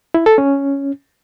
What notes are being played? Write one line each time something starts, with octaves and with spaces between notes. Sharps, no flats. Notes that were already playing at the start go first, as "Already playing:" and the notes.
E4
A4
C#4